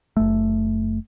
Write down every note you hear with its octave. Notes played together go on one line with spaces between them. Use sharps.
F#1 A3